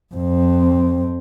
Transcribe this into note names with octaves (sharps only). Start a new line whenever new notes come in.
F2 C4